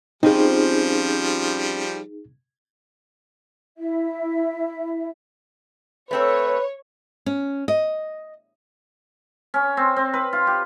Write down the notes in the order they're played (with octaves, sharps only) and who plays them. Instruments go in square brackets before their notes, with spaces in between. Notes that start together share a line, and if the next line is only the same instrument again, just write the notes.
[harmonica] F3 G3 [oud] C4 C#4 F4 [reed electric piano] D#4 G#4
[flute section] E4 E5
[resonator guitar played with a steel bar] A3 C4 A4 [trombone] B4 [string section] C#5
[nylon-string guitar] C#4
D#5
[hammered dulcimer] C#4
C4
C4
B4
F4
G4